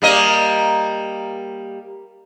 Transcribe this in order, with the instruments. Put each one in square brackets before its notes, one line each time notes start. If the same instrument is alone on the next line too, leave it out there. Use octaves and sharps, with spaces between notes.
[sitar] G3 A#3 D#5